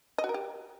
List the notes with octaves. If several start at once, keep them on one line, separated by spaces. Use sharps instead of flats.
D#5
F#4
A#4
G4